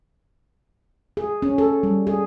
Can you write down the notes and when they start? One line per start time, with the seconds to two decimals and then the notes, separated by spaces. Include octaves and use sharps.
1.17 G#4
1.42 C#4
1.58 A4
1.83 G3
2.07 G#4